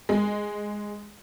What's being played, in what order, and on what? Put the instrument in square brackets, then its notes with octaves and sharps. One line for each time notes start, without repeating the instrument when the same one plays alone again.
[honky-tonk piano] G#3